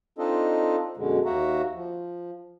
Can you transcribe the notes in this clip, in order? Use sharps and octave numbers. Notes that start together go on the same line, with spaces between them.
C4 D4 D#4 F4 A4 D#5
F#2 B2 D3 G#3
D#2 A#3 F#4 E5 F#5 A#5
F3